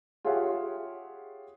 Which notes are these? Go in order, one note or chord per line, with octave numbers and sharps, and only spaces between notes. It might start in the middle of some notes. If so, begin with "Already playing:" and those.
F4 G4 G#4 C#5 E5 F#5